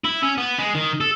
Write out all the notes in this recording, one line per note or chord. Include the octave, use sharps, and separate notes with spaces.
E4
C#4
B3
G#3
D#3
A4